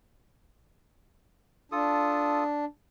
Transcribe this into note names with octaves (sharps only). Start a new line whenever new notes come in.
D4 F4 A4 D#6